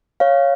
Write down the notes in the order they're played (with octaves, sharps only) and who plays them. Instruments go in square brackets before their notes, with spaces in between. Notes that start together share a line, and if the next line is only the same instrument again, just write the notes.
[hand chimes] C#5 F5